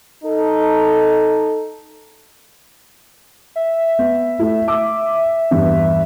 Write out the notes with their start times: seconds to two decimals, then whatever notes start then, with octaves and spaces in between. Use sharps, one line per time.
0.24 D#4 A4
3.56 E5
3.99 B3
4.39 A3 E4
4.68 D6 E6
5.51 E2 G2